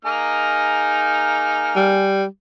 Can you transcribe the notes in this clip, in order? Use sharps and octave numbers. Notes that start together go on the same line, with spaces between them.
A#3 D#4 G#4 F6
G3